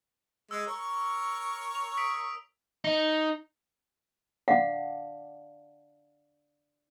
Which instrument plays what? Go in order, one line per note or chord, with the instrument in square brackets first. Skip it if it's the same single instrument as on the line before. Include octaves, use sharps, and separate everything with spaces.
[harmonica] G#3 [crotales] E6
[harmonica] A#4 C#5 C#6
[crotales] F7
D#6 B6 D7
[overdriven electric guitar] D#4
[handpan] D4 D5 [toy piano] F5 F#5